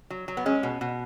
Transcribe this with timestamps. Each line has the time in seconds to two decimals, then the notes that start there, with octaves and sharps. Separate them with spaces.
0.10 F#3
0.28 F#3
0.37 B3
0.46 G#3 C#4
0.63 B2
0.81 B2